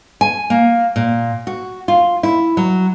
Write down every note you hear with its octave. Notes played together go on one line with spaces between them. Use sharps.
G#5
A#3
A#2
F#4
F4
E4
F#3